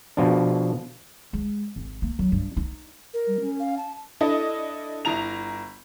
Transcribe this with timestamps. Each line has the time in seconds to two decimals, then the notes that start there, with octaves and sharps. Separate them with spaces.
0.17 B2 F3 D4
1.33 G#3
1.76 G#1
2.02 A#3
2.19 F#3
2.32 G2
2.57 D#4
3.14 A#4
3.27 G3
3.41 C#4
3.60 F5
3.77 A5
4.20 D4 E4 A4 D#5
5.05 G1 E4 A#5 F7